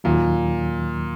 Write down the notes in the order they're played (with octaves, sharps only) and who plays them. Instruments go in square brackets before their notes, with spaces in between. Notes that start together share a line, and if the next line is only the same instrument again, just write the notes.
[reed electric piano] D#2 D#3 F#3 [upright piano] A#2